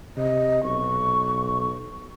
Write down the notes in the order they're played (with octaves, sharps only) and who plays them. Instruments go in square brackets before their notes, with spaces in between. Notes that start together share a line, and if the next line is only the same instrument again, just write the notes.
[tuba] C3 [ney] D#5
[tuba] B1 [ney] C#6